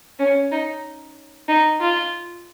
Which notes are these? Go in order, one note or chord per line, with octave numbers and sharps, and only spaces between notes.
C#4
D#4
D#4
F4